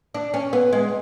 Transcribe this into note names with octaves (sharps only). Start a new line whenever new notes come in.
D4
C#4
B3
G#3